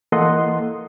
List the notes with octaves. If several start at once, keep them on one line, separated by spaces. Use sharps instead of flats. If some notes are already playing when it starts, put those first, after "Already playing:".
E3 A#3 A4 D#5 F#5 C6